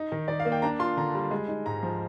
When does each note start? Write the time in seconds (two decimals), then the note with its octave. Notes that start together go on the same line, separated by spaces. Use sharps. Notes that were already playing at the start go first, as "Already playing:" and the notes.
Already playing: D#4
0.12 D#3
0.28 D#3 D5
0.40 F5
0.45 A#3
0.52 G5
0.62 D4 A#5
0.79 F4 C6
0.97 D3 A#5
1.14 G3
1.31 G#3
1.48 D#4
1.66 G#2 A#5
1.83 F3